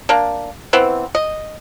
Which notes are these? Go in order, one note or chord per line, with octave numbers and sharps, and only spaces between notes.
A#3 D4
E3 B3 C4
D#5